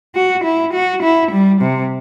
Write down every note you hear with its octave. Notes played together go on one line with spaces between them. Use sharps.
F#4
E4
F#4
E4
G3
C3